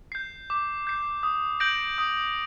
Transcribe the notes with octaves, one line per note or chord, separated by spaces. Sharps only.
G6 C7
D6
G6 C7
D#6
G6 A#6 D7 F#7
D#6